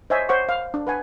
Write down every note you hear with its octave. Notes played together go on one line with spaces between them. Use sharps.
C5 C#5 D#5 E5 G#5
C5 C#5 F#5 C#6 D6
F5
D4
B4 F#5 G#5